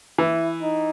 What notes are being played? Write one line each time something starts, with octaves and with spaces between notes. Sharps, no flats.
E3 E4
D#4